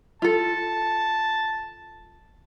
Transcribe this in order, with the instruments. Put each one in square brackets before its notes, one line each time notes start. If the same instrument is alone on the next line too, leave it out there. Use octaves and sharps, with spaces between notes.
[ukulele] F4 A4 [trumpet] A5